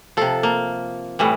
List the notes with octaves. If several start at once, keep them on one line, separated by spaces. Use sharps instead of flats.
C3 F3 A4
A#3
A2 E3 G3